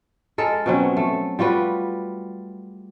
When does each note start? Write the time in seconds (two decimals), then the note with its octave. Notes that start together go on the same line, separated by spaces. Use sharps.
0.38 G#3 A4 A#4
0.66 B2 F#3 C4 C#4
0.97 A3
1.39 G3 F4 F#4 B4